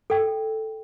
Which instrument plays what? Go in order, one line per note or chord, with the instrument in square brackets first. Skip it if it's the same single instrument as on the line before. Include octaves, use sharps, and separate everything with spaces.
[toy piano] A4 G5